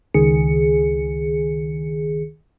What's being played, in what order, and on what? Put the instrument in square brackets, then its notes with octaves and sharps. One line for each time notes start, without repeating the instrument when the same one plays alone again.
[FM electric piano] C#2 D#3 G#4 C#7